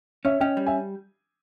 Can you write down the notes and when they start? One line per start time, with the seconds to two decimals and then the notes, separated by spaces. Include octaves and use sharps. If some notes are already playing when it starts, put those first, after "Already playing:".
0.25 C#4 C#5 E5
0.40 C#4 D#5 G5
0.57 G3
0.66 E5 G#5